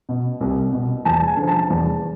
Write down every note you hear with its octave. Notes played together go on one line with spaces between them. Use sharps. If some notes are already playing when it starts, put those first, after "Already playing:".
B2
C2
B2
E2 A5
G#5
D3 F3
A5
E2